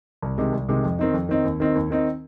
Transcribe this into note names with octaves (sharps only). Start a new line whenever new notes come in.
C2
C3 D#3 G#3
C2
C3 D#3 G#3
F2
D#3 C4 D#4
F2
D#3 C4 D#4
D#2
D#3 C4 D#4
D#2
D#3 C4 D#4